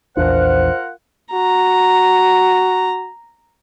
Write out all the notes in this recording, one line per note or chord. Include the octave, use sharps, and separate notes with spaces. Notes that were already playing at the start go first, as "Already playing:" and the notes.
A#1 E2 D4 F4 A#4 C5 F#5
F#4 A#5